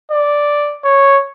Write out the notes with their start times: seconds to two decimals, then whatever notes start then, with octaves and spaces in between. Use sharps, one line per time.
0.11 D5
0.84 C#5